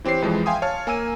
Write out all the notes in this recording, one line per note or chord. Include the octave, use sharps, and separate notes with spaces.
E3 C4 G4 C#5 C7
F2 E3 F3 G#3
E5 F5 G5 G#5 C6 D#6
C#5 F5 A5 F6
A#3 G#5 E6 D#7